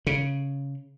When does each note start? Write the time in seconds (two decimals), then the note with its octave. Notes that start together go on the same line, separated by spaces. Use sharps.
0.07 C#3